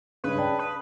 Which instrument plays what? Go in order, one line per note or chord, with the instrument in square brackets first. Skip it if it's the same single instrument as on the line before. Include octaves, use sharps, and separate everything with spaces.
[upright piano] C#2 G2 [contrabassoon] C#3 [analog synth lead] B4
[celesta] D5 G5 [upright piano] A5
[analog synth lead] B4 [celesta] D#6